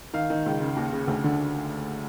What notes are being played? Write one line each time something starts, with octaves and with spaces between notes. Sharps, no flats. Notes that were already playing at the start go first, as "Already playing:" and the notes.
D#3 F5
D#3
C#2
C#3
D#2
C#3
D2
D3